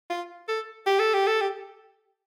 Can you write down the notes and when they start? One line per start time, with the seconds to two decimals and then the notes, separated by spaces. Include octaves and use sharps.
0.10 F4
0.48 A4
0.86 G4
0.99 A4
1.14 G4
1.27 A4
1.41 G4